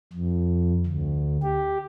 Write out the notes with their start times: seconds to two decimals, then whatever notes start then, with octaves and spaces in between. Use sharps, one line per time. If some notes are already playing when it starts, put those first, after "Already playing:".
0.13 F2
0.86 D2
1.43 G4